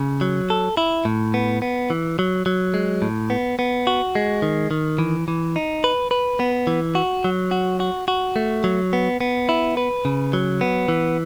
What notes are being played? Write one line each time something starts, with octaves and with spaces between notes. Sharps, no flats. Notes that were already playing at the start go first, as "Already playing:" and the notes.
Already playing: C#3
F#3
A4
E4
A2
B3
B3
E3
F#3
F#3
G#3
A2
B3
B3
F#4
G#3
D#3
D#3
E3
E3
D#4
B4
B4
B3
E3
F#4
F#3
F#4
F#4
F#4
A3
F#3
B3
B3
E4
B4
C#3
F#3
B3
E3